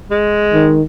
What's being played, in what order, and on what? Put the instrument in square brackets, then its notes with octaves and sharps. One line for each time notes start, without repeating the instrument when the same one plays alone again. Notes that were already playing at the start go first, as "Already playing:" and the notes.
[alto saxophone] G#3
[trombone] D#3